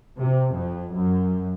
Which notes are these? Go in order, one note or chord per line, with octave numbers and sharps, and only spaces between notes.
C3
F2
F#2